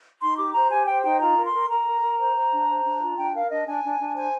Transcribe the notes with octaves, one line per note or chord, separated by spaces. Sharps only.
D#4 C6
G4 D6
C5 A#5
G4 G#5
C5 G5
D#4 G5
F4 A#5
A#4
C6
A#4
A#4 A#5
A#4
A#4
C5
C5
D4
C5
D4
F4
D4 G5
A#4 F5
D4 D#5
D4 G#5
D4
D4
C5 G#5